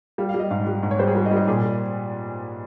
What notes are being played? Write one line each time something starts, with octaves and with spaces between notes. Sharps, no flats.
G3 F5
F5
G3
D#5
G#2 F5
G3
G#2
C#5
G3 C5
G#4
G3 A#4
D#5
G3
D#5
A#2 G#4
A#2